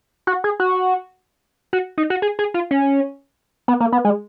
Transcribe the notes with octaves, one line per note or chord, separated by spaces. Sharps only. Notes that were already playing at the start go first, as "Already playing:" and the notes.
F#4
G#4
F#4
F#4
D#4
F#4
G#4
G#4
F4
C#4
B3
A#3
B3
G#3